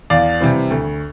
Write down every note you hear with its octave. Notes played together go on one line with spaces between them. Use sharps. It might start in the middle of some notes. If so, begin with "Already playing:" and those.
E2 D5 F5
C3 E3 G3 C4
D2